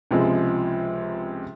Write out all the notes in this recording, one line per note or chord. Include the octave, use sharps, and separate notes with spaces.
C#2 C3 F3 G#3